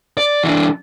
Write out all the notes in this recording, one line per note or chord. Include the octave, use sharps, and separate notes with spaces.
D5
E3 D4